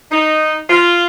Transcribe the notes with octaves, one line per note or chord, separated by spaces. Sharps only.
D#4
F4